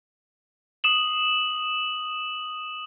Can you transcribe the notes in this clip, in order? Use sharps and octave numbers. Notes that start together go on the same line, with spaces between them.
D#6 E7 F#7